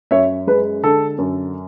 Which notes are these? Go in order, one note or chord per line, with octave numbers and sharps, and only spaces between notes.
F#2 C#5 E5
G#3 B4
D3 A4
F#2